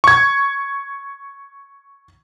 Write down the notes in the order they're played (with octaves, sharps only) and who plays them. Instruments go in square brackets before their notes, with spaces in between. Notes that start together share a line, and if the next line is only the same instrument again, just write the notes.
[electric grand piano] C#6 G#6